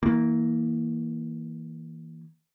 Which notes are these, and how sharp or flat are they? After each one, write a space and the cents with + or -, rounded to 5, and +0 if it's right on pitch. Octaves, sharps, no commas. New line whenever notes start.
E3 -25 A#3 +0